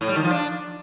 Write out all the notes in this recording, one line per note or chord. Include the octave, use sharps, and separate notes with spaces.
A2
G3
D#3
F3
D4